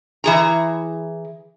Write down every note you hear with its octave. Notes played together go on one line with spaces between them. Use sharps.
E3 G#4 A#5